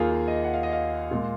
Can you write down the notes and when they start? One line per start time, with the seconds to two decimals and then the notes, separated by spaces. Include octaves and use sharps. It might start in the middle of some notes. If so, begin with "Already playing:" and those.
Already playing: D#2 D#3 A#3 F4 G#4
0.11 F4
0.28 D#5
0.44 F#5
0.54 F5
0.63 D#5
0.73 F5
1.11 A#2 G#3